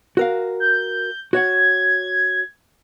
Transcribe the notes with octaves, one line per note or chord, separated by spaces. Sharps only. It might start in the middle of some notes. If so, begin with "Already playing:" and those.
F#4 A#4 F5
G6
F#4 C#5 F#5 G#6